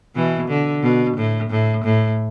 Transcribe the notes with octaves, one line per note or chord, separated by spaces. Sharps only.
B2 E3
D3
B2
A2
A2
A2